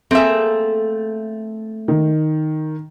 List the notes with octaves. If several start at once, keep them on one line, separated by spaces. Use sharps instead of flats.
A3 A#3 C4 G#4 E5
D#3